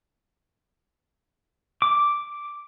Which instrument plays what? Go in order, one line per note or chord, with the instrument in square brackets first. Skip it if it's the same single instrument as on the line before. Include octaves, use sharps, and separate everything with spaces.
[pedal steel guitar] D6